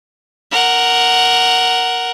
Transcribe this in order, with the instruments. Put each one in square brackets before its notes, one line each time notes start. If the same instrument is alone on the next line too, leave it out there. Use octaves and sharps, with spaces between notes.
[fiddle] A#4 F#5